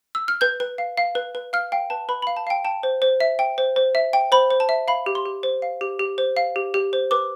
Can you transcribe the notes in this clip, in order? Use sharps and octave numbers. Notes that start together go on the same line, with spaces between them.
E6
F6
B4 G6
B4
F5
F5
B4
B4
F5 F6
F5 G5
B4 A5
B4 B5
F5 B5
A5
F5 G5
G5 A5
C5
C5
E5
G5
C5
C5
E5
G5
C5 B5
C5
A5
E5
F5 B5
G4
C6
G4
C5
F5
G4
G4
C5
F5
G4
G4
C5
B4 D6